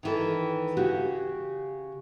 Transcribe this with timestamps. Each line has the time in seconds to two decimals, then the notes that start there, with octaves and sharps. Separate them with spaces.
0.03 D#3 E3 A4
0.77 C#3 F#4 G4